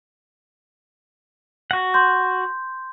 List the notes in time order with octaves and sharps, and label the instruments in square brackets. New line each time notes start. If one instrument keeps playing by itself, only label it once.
[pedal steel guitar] F#4 F#5
[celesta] C6 G6